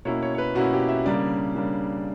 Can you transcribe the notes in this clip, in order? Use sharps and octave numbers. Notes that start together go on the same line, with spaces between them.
B2 A#3 C#4 E4 C#5
C#5
C#5
B4
B2 A#3 C#4 E4 F#4
G4
E5
C#3 G3 A#3 D4 D5
C#3 G3 A#3 D4